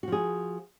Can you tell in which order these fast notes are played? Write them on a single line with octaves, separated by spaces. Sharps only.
F#4 F3 G#4